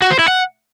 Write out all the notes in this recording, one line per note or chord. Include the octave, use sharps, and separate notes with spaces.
F#4
C5
E4
F#5